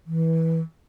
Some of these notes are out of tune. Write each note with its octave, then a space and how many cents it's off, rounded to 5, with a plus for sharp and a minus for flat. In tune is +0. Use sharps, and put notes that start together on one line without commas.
E3 -15